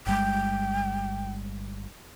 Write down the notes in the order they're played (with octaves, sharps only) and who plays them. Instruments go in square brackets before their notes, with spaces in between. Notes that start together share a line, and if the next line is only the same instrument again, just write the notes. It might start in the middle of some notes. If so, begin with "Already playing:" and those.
[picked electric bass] G1 G3 G#3 [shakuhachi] G5